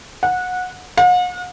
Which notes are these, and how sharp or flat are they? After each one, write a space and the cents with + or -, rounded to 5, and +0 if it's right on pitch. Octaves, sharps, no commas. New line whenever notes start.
F#5 -20
F#5 -45